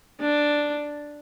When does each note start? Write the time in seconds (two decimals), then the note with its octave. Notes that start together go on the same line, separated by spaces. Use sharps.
0.21 D4